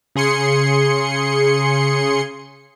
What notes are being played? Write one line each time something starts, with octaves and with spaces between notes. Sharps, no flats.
C#3 G#4 C6 C#7